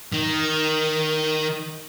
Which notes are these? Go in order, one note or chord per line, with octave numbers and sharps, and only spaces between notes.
D#3